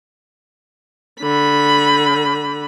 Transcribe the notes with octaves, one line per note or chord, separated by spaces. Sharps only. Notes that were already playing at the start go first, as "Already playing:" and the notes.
D3 B5